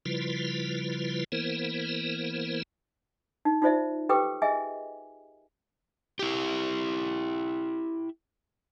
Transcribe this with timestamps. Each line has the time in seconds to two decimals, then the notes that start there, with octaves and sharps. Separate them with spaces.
0.06 C#3 F3 G3 E4 F4 B4
1.32 E3 A#3 B3 E4 A#4 C5
3.45 D#4
3.62 D#4 F4 C5 D5 E5
4.09 G4 A4 B4 G5 D6 D#6
4.42 G#4 D#5 E5 G#5
6.19 E4 G4